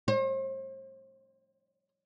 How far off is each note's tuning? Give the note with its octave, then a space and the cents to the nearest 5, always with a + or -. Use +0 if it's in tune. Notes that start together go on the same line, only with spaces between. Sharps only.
C5 +40